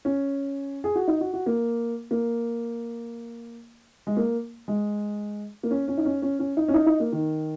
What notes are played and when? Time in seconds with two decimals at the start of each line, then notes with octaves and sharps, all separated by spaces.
0.05 C#4
0.84 G#4
0.95 F#4
1.08 D#4
1.21 F#4
1.34 F#4
1.46 A#3
2.11 A#3
4.07 G#3
4.17 A#3
4.68 G#3
5.63 A#3
5.71 C#4
5.88 C#4
5.97 D#4
6.05 C#4
6.22 C#4
6.39 C#4
6.57 D#4
6.68 C#4
6.74 D#4
6.86 D#4
7.00 A#3
7.12 D#3